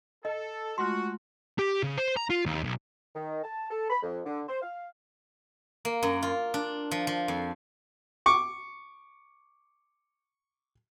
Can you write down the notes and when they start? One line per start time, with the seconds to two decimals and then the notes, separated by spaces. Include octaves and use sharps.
0.25 A4 D#5
0.78 G#3 A3 F4 F#4 C6
1.59 G4
1.83 C#3
1.97 C5
2.16 A#5
2.30 F4
2.46 D#2
2.64 B1
3.15 D#3
3.44 A5
3.71 A4
3.90 B5
4.03 F2
4.26 D3
4.49 C5
4.62 F5
5.85 A#3
6.03 F#2
6.22 F4
6.54 D4
6.91 F3
7.07 F3
7.28 F2
8.26 C#6 D6